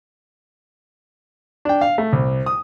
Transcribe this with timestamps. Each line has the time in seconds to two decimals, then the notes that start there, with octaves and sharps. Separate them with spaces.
1.65 D4 G5
1.81 F5
1.98 A3
2.13 C2
2.46 D#6